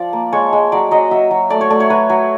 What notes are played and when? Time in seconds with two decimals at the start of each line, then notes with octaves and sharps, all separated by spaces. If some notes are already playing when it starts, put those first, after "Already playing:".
Already playing: F3 D5
0.13 A#3
0.32 G#3 C#5
0.53 G#3
0.72 F#3 D5
0.91 F#3 D#5
1.11 F#3 E5
1.31 F#3
1.50 A3 D5
1.61 C#5
1.70 A3 D5
1.80 C#5
1.90 F#3 B4
2.09 F#3